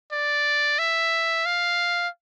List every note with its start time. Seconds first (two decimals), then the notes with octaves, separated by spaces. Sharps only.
0.12 D5
0.79 E5
1.46 F5